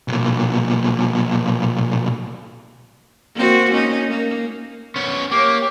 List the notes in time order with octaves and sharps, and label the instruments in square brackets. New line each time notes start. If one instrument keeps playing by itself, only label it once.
[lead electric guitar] B1 A#2
[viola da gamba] A#3 C4 F#4
C#4 D#4
A#3
[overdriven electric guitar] B3 C#4
[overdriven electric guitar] A#3 [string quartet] G4 C#5 [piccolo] D6